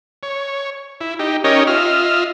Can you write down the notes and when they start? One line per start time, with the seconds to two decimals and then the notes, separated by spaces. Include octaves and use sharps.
0.23 C#5
1.01 E4
1.19 D#4 G4
1.44 C#4 D#4 G4 A#4 C#5 D#5
1.67 F4 D#5 E5 F6